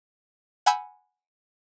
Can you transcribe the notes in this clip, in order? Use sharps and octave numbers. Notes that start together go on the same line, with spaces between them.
F#5 G#5 B5 E6 G6